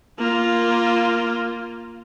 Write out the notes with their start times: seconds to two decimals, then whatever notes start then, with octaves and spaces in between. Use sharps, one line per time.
0.18 A#3 F4